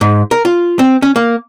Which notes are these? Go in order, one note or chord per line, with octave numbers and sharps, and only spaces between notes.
G#2
A#4
F4
C4
C#4
A#3